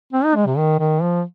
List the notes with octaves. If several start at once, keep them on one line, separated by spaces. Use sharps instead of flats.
C4
D#4
G#3
C3
D#3
D#3
F3